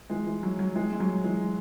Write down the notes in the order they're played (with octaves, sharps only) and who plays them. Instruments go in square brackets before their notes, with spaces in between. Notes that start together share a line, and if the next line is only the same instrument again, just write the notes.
[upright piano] E3 G#3
E3
F#3
F#3
E3 G#3
G#3
F#3
E3 G#3